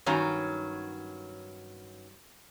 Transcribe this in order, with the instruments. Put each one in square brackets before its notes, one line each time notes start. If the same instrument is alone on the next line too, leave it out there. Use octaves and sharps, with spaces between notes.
[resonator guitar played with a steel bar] G2 D#3 F#3 C#4 A#5